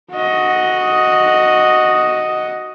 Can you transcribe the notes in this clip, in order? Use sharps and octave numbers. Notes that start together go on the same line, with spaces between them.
F#4 D#5